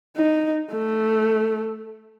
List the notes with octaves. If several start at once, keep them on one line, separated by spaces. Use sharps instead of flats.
D#4
A3